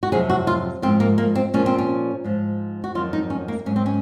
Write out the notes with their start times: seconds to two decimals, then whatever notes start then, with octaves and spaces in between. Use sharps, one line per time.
0.03 F#4
0.12 F2 C3 F#3 G#4
0.29 F#4
0.47 F4
0.82 G#2 F3 C4
1.00 A#3
1.18 A#3
1.35 C4
1.54 A#2 F3 C#4
1.66 C4
1.78 C#4
2.24 G#2 F3
2.84 F#4
2.95 F2 D#3 F#3 F4
3.13 D#4
3.30 C#4
3.48 A#3
3.66 G#2 F#3 C#4
3.76 C4
3.86 C#4